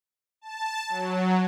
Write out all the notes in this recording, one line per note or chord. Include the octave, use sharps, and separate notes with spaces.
A5
F#3